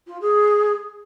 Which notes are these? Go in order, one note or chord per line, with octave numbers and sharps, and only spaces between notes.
F4
G#4